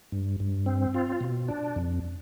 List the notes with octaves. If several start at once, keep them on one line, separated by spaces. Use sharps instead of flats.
G2
G2
C4
F4
B2
D4
F2